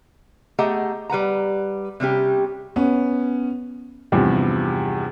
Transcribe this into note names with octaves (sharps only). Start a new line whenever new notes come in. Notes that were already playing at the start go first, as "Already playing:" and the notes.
A3 G4 G#4 D#5 F#5 A#5
G3 B4 F#5 A#5
C3 G3 C#4 G4
B3 C#4
E2 G2 C3 F3